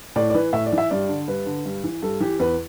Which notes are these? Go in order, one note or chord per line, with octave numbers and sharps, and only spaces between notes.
A2 D5
D5
E3 B4
A2 E5
D5
E3
E5
G2 D5
D3
G2 B4
D3
G2
E3
G2 A4
E3 G4
E2 B4